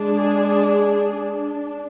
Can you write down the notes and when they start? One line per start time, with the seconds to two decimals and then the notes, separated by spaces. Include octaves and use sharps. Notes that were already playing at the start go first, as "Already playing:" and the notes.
Already playing: G#3 D4
0.16 G#4
0.65 G#4
1.14 D4